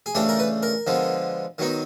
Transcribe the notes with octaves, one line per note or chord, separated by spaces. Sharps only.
G#4
C#3 E3 A3 D4 G4
A#4
B4
A#4
D3 F3 G#3 B3
D#3 F#3 B3 D#4